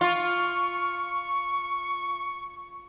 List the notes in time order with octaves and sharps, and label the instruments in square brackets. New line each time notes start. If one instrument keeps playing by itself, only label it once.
[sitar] F4 [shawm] C#6